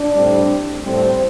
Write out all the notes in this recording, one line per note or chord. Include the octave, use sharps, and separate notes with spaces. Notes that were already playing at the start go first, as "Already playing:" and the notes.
Already playing: D4
A2 G3 C4
A2 G3 C4